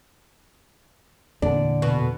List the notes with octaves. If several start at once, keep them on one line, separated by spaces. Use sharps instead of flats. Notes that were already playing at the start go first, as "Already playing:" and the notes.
E2 A#2 D3 D4
B2